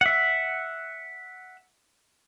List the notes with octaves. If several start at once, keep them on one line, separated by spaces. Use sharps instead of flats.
E5 F#5